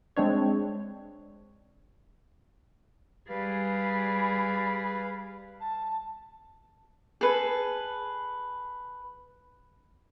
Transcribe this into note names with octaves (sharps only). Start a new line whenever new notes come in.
G#3 C4 D4 C#5
G3 G#4 B4 F5
B5
A5
G#4 A4 B4